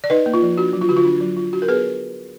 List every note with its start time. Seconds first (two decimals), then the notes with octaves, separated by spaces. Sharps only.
0.04 D5
0.10 D#4 B4 D#5
0.26 A#3
0.34 F4
0.42 F3
0.58 D4 F#4
0.73 F#3
0.81 F4
0.89 D3 F#4
0.97 F4
1.05 D4
1.21 F#3
1.37 F4
1.53 D4 F#4
1.62 A#4
1.68 B3 G#4 B4